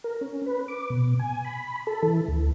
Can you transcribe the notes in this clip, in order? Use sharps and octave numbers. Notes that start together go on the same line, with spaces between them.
A#4
C#4
B4
D6
B2
G#5
B5
A4
E3
D2